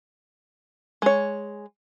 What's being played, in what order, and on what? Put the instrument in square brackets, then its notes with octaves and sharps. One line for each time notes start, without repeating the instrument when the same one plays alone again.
[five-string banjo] G#3 C#5